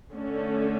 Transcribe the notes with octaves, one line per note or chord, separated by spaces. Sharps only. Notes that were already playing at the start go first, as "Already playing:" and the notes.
D3 A3 C#4